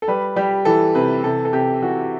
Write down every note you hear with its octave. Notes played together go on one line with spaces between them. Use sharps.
A4
G3 B4
G3 G4
E3 A4
C3 B4
C3 A4
A4
C3 G4
E3 F#4